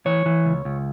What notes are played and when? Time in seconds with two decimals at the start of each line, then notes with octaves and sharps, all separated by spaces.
0.06 E3 C#5
0.26 E3
0.45 C#2
0.65 C#2